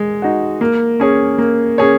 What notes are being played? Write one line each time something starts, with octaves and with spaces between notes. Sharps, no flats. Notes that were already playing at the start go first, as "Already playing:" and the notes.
Already playing: G#3
D#4 F#4
A#3
C#4 G#4 C#5
A#3
C#4 G#4 C#5